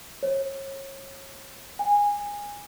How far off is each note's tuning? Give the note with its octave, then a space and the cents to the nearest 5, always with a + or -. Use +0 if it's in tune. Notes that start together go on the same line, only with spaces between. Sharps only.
C#5 -30
G#5 -20